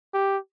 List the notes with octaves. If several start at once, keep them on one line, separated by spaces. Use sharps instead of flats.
G4